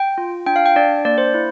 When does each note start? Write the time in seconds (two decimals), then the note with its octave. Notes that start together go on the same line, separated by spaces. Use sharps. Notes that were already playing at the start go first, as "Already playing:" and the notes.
Already playing: G5
0.18 F4
0.46 D4 G5
0.56 F5
0.66 G5
0.76 D4 D5
1.05 A#3 D5
1.18 C5
1.34 E4